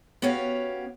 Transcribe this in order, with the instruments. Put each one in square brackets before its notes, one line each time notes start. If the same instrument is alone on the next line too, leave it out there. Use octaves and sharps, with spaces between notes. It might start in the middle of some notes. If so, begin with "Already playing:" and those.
[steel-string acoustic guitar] B3 C#4 F#4 G4 C#5 F5